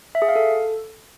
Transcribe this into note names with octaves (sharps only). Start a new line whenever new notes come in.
E5
G#4
F5
A4